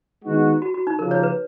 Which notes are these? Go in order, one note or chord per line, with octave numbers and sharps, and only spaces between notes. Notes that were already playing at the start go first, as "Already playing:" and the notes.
D#3 G#3 B3 D#4 F#4
F#4
F#4
D#4
C#3 F3 A#3 A#4
C#5
B4